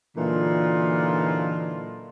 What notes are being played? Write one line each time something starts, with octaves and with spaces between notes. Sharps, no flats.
A#2 D3 E3 F#3 D#4 F4